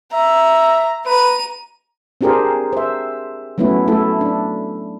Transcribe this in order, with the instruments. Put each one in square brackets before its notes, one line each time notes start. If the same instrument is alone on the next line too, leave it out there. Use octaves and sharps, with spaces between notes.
[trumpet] E5 [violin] A#5
[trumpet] B4 [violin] A#5 D#7
[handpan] C4 D4 G4 G#4 A#4 C5
C5 E5
F#3 A3 B3 C#4 E4
A3 E4 A4
D4